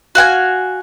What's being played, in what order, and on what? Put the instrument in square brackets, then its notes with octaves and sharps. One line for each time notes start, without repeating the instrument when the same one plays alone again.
[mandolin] F#4 F5 G5 G#5